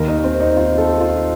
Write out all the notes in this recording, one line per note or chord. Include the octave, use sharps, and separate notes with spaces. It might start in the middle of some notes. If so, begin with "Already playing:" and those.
Already playing: D#2 D#3 A#4
D#4
C4
D#4
F4
A4
F4